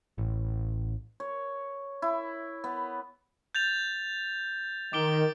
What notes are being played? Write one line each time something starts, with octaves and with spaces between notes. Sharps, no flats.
A1
C#5
E4
B3
G6 A6 F7
D#3 D6 D7 G7